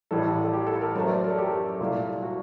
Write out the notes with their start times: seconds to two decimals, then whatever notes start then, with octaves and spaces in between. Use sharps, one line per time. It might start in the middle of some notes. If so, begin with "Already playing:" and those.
0.11 A1 A2 G3 A4
0.44 A4
0.53 G4
0.67 A4
0.81 A#4
0.95 F#2 F#3 A3 A5
1.03 C5
1.09 D5
1.24 A#4
1.31 A4
1.38 G4
1.80 C2 A#2 A3
2.22 F#4